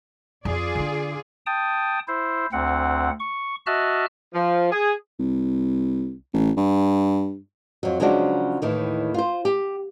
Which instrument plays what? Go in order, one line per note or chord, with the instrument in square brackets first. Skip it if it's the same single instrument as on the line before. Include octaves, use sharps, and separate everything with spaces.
[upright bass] F2 [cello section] F4 G#4 D5
[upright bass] D3 D4
[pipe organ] G5 A5 D#6
E4 C5
D2 C4 F#5
C#6
F#4 D#5 E5 A5 F6 F#6
[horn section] F3
G#4
[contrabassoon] C2
A1
G2
[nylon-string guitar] F2 F#3
C#3 F3 F#3 G#3 D4 F#4
D#2 A2 D#3 E3
F4 C5
G4